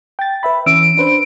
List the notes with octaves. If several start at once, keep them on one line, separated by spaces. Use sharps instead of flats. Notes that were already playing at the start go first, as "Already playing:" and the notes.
G5 A6
B4 E5 B5
E3 C#4 E6 D7
D4 B4 C5